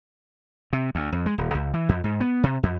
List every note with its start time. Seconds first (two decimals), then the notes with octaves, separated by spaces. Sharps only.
0.73 C3
0.95 D2
1.12 F2
1.26 G#3
1.38 D#1
1.55 C#2
1.74 E3
1.89 F2
2.04 G#2
2.21 B3
2.43 C3
2.63 F2